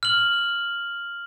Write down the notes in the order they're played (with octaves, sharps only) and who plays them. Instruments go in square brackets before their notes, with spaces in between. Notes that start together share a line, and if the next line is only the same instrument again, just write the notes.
[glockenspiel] F6 F#7